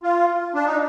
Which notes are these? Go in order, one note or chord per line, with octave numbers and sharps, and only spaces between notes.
F4
D4
D#4